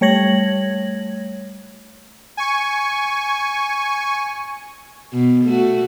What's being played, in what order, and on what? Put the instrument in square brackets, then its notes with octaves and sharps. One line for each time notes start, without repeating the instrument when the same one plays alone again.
[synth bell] G3 A3 C#5 G#6 A#6 F#7
[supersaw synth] G#5 C#6
[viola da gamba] B2
A3 F#4